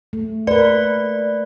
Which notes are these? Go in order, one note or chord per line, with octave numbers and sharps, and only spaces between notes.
A3
A#4 B4 D5